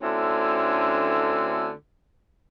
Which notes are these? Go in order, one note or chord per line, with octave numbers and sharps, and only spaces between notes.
D2 D3 C4 C#4 E4